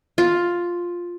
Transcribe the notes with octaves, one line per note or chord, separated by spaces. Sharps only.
F4